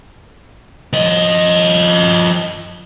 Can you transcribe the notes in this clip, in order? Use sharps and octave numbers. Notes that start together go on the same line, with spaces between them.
F3 D#5